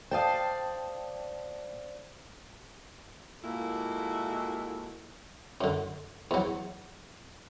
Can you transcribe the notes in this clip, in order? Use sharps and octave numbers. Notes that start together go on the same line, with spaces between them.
C5 D5 F5 G5 A5 D#6
A#2 G#3 A#3 E4 F#4 A4
F#2 D3
E2 F#3